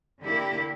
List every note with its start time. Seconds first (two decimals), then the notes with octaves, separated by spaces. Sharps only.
0.22 D3 A#3 E4 G4